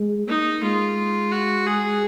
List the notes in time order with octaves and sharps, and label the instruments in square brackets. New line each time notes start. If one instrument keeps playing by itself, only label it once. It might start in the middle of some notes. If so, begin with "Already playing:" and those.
Already playing: [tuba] G#3
[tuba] A#3 [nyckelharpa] D#4
[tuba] G#3 [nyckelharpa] F4
[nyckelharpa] F#4
G#4